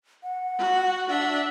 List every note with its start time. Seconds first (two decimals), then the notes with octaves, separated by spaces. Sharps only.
0.23 F#5
0.58 F#4
1.08 D4 E5